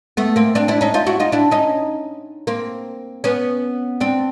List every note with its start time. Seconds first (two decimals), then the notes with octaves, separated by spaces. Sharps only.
0.17 A3 B3
0.36 A#3 C4
0.55 C4 D4
0.68 D4 E4
0.81 C#4 D#4
0.94 D#4 F4
1.06 E4 F#4
1.20 D#4 F4
1.32 D4 E4
1.51 C#4 D#4
2.47 A#3 C4
3.24 B3 C#4
4.00 C4 D4